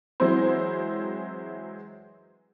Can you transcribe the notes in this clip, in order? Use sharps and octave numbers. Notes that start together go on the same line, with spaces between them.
E3 F#3 G#3 C4 E4 C5